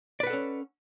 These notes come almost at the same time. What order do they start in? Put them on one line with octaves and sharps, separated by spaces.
D5 B4 F#5 A4 C#4